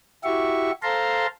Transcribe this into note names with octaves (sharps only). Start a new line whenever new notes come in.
E4 F#4 G4 E5 C#6
A4 C5 F5 A5 A#5 C6